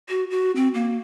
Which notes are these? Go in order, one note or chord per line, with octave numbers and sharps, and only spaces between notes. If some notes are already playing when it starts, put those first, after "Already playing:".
F#4
F#4
C4
A#3